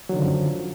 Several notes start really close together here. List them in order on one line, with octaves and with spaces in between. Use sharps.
F#3 D#3 D3 F3 F#2